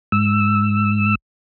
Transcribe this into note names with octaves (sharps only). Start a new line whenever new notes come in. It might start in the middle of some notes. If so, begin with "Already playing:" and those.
G#2 E6